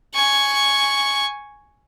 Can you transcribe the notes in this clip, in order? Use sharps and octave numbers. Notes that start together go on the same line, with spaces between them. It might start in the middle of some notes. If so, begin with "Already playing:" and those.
G#5 C#6